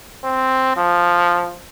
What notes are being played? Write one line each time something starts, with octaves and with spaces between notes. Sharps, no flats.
C4
F3